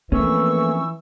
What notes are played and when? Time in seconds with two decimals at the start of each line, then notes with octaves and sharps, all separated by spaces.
0.12 E3 F3 A3 A#3 C4 C#4 C#6 E6